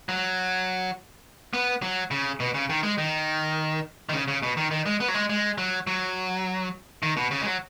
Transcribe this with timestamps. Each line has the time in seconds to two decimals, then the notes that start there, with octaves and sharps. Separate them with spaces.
0.09 F#3
1.53 B3
1.82 F#3
2.11 C#3
2.40 B2
2.54 C#3
2.69 D#3
2.83 G#3
2.98 D#3
4.09 D#3
4.13 C#3
4.28 C#3
4.43 B2
4.57 D#3
4.71 D#3
4.86 G#3
5.00 B3
5.08 F#3
5.14 G#3
5.30 G#3
5.58 F#3
5.87 F#3
7.03 D#3
7.17 B2
7.31 C#3
7.41 G#3
7.46 F#3